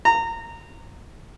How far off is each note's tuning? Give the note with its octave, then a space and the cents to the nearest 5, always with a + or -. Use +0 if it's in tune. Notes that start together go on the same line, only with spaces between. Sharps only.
A#5 -25